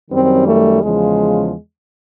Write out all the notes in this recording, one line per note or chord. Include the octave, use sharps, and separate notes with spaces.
F#2 D#3 G3 C4
A3
E2 C#3 F3 G#3